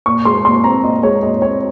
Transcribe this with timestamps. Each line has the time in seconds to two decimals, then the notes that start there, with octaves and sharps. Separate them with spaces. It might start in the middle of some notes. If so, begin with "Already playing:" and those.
0.06 A#2 C#6
0.25 G#3 C6
0.45 A#2 C6
0.64 C4 A#5
0.84 A#2 D#5
1.03 G#3 C#5
1.23 A#2 D#5
1.42 C4 C#5